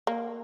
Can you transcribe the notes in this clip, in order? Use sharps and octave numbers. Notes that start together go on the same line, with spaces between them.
A#3